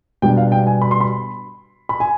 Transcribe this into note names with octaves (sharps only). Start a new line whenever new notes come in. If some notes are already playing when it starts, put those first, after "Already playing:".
B2 G3 D4 G5
F5
G5
G#5
B5
C6
B5
B5
G#5